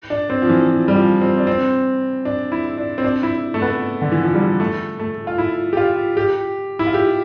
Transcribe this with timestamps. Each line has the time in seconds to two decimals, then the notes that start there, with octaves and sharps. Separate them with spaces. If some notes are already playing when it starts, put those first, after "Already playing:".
0.10 D4
0.30 C4
0.42 F3
0.49 E3
0.69 F3
0.88 G3
0.95 F3
1.21 C4
1.38 D4
1.47 C4
2.25 D4
2.52 E4
2.78 D4
2.98 C4
3.04 D4
3.23 E4
3.54 A3
3.62 B3
4.02 D3
4.12 E3
4.23 F3
4.34 G3
4.60 A3
4.99 A3
5.27 F4
5.38 E4
5.73 G4
5.77 F4
6.17 G4
6.79 E4
6.87 F4
6.94 G4